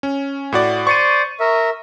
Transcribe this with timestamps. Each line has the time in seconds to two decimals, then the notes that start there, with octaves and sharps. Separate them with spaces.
0.03 C#4
0.52 A2 F#4 D5
0.87 C5 D5 C#6 C#7 D#7
1.40 A#4 E5